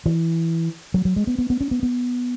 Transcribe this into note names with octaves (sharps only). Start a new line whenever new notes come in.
E3
F#3
F#3
G#3
B3
B3
B3
C#4
B3
B3